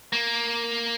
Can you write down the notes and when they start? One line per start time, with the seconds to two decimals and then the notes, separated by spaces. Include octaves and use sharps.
0.13 A#3